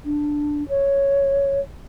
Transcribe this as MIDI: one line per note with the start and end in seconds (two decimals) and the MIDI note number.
0.05 0.67 62
0.69 1.60 73